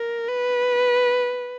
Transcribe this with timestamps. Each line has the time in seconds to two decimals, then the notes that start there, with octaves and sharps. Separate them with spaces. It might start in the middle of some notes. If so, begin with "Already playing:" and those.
Already playing: A#4
0.28 B4